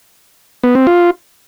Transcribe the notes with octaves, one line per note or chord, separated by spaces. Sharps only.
B3
C4
F4